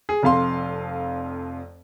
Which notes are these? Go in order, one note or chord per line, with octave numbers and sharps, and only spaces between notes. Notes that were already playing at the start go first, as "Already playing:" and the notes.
G#4
F1 F2 F5 C6